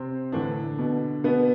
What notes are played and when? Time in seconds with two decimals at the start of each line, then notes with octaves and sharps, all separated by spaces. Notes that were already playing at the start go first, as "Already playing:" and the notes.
Already playing: C3 C4
0.32 A2 D3 E3 D4
0.78 B2
1.24 B2 B3